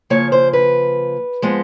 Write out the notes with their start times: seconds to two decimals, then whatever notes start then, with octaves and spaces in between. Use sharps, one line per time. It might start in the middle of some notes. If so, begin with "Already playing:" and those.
0.10 C#3 F3 A#3 C#5
0.32 C5
0.53 B4
1.42 F3 G#3 B3